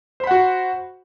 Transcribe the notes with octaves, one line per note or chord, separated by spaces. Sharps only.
F#4 C5 F#5 B5